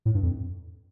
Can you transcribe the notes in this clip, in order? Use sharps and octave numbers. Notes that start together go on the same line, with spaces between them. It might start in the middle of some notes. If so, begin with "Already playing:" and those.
A2
G2
F2